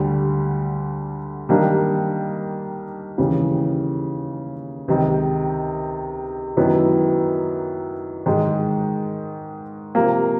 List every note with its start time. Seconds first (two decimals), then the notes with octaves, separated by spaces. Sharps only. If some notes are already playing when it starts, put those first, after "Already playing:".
Already playing: D2 D3 G3
1.49 D#3 G3 A#3 D4
3.18 D#2 C#3 E3
4.88 C#2 C3 D#3
6.56 F#2 D#3 F#3 B3 E4
8.26 G#2 D#3 G#3
9.95 C3 F3 A#3